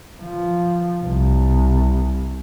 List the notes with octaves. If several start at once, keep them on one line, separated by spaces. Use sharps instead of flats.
F3
C2